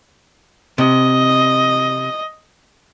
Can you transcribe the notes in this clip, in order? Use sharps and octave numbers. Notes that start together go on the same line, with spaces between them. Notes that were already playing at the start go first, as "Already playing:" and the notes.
C3 D#5